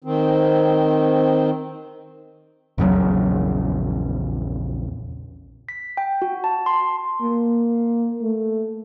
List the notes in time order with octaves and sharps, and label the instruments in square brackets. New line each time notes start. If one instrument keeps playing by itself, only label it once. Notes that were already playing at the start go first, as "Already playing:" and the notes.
[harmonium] D#3 C4
[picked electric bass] A#1 E2 C#3 F#3
[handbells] B6
G5
F#4
A5
C6
[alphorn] A#3
A3